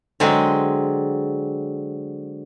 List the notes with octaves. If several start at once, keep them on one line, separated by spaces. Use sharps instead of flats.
D3 F#3 G#3 C4